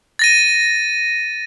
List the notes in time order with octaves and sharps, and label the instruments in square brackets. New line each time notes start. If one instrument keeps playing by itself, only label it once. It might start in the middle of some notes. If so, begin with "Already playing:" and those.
[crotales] A6 A#6 D#7